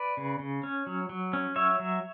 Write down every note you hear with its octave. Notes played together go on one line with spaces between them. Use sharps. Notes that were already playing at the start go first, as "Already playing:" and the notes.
Already playing: B4 D5
C#3
C#3
C#4
F#3
F#3
C#4
F#3 C#5 E5
F#3